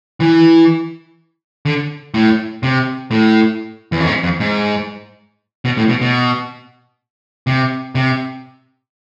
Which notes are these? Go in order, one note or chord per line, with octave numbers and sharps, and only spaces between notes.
E3
D3
A2
C3
A2
E2
F2
G#2
F2
G#2
B2
A2
B2
B2
C3
C3